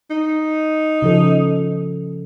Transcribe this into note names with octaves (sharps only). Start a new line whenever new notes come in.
D#4
C#3 F3 A4